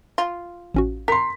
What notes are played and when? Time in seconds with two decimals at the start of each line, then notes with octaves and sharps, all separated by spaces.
0.18 F4
0.74 A1 C#4 F#4
1.08 A#4 C6 B6